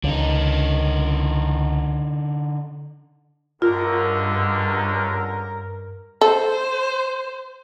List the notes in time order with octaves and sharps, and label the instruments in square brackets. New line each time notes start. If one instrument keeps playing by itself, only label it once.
[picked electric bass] C#2 [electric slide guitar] D3 D#4
[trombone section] C#2 D3 [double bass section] G2 [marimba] F4 [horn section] A#4
[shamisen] A4 [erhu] C5